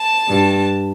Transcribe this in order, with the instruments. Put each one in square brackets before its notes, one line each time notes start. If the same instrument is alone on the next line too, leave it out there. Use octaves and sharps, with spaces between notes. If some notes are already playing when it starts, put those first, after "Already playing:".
Already playing: [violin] A5
[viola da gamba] G2